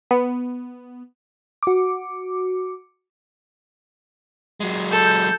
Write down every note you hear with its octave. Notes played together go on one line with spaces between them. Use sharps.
B3
F#4 D6
F#3 G#3
A4 G6